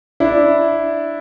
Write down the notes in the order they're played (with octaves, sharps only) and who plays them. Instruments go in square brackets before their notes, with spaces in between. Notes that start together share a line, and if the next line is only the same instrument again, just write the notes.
[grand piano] D4 E4